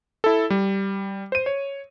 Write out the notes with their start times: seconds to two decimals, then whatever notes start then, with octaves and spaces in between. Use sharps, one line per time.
0.24 E4 A4
0.50 G3
1.32 C5 D#7
1.46 C#5